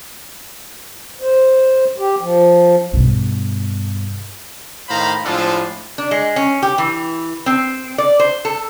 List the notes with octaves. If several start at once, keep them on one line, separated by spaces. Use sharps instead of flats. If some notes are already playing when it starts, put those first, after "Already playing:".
C5
G4
F3
G2 B2
A2 D#3 C5 F5 A#5 B5
A2 F3 G#3 D4 F4 A4
D4
G#3
C#4
G4
E3
C4
D5
C5
A4